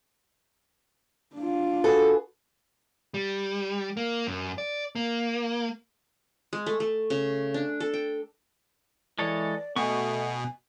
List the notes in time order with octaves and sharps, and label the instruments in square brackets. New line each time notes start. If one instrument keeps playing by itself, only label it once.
[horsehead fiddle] D4 F4
[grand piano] F#4 G#4 B4 [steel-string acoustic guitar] A4
[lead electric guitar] G3
A#3
F#2
D5
A#3
[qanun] G#3
A3
A3
C#3
D4
A4
G5
[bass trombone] E3 [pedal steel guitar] G#3 A4 C#5 [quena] D5
[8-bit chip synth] B2 [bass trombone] A3 [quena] G#5 [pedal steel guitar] C#6